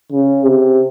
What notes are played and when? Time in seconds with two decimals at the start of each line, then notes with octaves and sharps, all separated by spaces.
0.12 C#3
0.46 C3